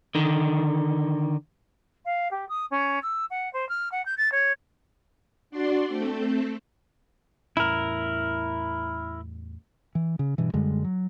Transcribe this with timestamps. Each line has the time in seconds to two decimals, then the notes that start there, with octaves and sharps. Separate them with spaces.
0.15 D3 D#3
2.05 F5
2.31 G4
2.49 D#6
2.71 C#4
3.02 E6
3.30 F#5
3.53 C5
3.69 F6
3.92 F#5
4.06 G6
4.18 A6
4.32 C#5
5.51 D4 F#4 D5 C6
5.86 A3 C4 A4
7.57 E2 A2 C#4 E4 A#4
9.95 E3
10.19 C#3
10.38 G2 B2 E3
10.54 F#2 D3 G3 G#3
10.85 F#3